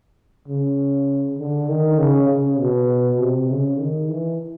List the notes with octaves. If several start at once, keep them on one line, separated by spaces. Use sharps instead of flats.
C#3
D3
D#3
C#3
C#3
B2
C3
C#3
D#3
E3